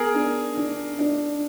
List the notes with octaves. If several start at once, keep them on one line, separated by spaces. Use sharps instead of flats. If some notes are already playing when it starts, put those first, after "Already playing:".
Already playing: B3 G#4 A#4
D4
D4
D4